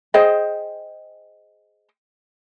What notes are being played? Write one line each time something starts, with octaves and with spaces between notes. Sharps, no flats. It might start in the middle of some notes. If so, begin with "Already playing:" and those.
G#4 C5 D#5 G5